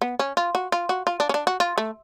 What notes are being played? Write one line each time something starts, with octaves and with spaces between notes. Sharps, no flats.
B3
C#4
F4
F#4
F4
F#4
F4
D4
C#4
D4
F#4
F4
A3